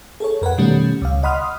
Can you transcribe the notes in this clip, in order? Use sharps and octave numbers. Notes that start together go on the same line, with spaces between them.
G#4 A4 C#5
F2 A#4 B4 F#5
B2 D#3 G3 A3 C#4
C#2 F5
D#5 F#5 B5 C6 D#6 F6